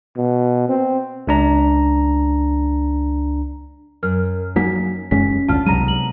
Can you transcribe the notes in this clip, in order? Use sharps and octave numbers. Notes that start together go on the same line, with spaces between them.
B2
C4
C#2 D4 A#5
F#2 A#4 F6
F3 F#3 A#3 D#4 B6
F1 F#2 G#3 C#4 B6
G#1 D2 D4 F4 A5 F6
C2 C3 F#3 G#3 B3 A#5 D#7
F#7